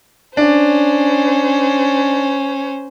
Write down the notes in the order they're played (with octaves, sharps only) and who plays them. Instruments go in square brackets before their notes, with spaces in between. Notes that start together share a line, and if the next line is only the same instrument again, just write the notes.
[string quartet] C#4 C5 [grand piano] D4